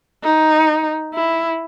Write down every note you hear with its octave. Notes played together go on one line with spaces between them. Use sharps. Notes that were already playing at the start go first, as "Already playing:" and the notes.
D#4
E4